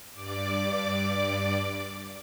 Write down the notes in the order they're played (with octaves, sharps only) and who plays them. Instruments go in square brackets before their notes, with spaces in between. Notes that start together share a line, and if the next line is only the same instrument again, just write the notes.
[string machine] G2 D5 D6